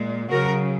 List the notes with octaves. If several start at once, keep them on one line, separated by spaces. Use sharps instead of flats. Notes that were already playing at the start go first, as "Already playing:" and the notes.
Already playing: A#2 G#3
C#3 F#3 F#4 A#4